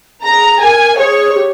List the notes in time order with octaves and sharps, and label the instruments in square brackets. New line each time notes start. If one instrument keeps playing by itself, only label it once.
[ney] G#4 [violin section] A#5
[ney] A#4 [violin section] G#5
[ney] G#4 [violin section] C#5
[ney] G4